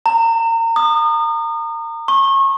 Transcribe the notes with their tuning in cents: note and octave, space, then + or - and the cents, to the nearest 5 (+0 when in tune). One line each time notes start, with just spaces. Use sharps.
A#5 -30
D#6 -35
C#6 -35